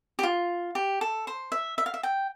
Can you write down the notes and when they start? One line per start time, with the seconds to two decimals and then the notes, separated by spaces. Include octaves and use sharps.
0.19 G4
0.23 F4
0.75 G4
1.01 A4
1.27 C5
1.52 E5
1.78 E5
1.86 F5
1.94 E5
2.03 G5